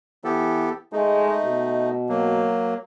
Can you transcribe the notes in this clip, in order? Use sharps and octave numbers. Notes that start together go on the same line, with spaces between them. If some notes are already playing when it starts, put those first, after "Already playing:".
E3 B3 G4 A4
G#3 A3 D#4
B2
F#3 A#3